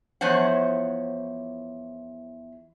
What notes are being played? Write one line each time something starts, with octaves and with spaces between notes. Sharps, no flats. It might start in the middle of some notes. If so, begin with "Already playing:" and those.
E2 F3 C5 C#5 F#5